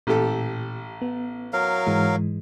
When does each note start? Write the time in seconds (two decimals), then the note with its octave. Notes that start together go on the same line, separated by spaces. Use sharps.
0.07 A1 A#2 G4 A4
1.02 B3
1.53 F#3 A#4 F5
1.87 G#2 E3 G#3